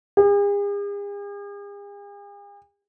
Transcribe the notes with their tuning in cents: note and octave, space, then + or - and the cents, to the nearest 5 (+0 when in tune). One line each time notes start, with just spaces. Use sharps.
G#4 -45